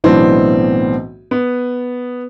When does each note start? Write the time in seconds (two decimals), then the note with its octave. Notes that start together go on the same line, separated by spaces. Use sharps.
0.04 B1 A2 E3 B3 C4 D4
1.31 B3